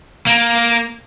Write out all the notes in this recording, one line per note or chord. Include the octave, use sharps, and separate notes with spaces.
A#3